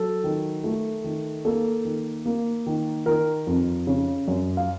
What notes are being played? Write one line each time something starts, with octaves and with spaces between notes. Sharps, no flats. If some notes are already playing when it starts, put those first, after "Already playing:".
Already playing: F#3 A4
D#3
A3
D#3
A#3 A4
D#3
A#3
D#3
D#3 A#4
F2
C#3
F#2
F5